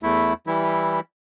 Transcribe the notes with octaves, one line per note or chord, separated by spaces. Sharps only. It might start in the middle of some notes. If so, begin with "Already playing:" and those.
E2 A3 E4
E3 G3 E4